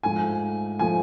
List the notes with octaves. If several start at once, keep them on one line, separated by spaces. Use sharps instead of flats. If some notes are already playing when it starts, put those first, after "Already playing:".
G#2 F3 A3 G#5
F3 A3 G#5